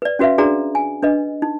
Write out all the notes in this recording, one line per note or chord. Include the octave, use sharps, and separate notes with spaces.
B4 D5
C#4 F#4 B4 E5 F5
D4 F#4 G#4 B4 D5 A#5
G#5
D4 B4 D#5
D#4